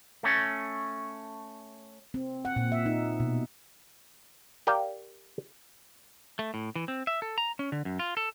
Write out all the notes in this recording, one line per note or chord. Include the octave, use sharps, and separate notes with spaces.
A3 C#4
C4
F#5
A#2
E5
D#4
B2
G4 A#4 D5 F5 G5
A3
A2
E3
C4
E5
A4
A#5
C#4
D3
F#2
F4
A4